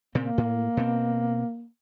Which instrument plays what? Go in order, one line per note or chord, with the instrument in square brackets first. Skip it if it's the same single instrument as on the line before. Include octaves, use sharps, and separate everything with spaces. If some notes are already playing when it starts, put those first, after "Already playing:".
[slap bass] A#2 C#3 C4 [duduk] A#3
[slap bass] A2
B2 C4